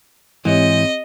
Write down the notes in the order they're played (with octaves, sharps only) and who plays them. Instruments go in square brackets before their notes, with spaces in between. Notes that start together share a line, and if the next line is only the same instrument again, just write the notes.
[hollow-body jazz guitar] G#2 E3 [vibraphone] C4 G4 C#5 [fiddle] D#5